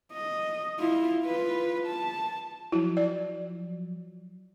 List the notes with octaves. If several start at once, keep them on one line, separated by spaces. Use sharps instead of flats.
D#5
E4 F4
F4 B4
A5
F3 F#3 E4
D5